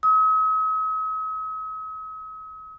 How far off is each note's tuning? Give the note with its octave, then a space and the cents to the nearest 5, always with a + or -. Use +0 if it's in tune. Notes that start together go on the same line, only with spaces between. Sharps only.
D#6 +45